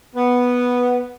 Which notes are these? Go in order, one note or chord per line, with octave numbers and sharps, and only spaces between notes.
B3